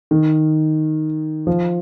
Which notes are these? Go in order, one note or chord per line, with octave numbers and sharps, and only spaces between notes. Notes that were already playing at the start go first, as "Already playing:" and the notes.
D#3
F3